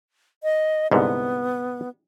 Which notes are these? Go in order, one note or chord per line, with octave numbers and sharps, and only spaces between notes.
D#5
C2 G#2 D3 B3